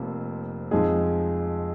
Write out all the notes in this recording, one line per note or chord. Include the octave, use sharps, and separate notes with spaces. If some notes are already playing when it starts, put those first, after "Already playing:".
Already playing: F1 F2 F3 A#3
F2 F3 G#3 D#4 G#4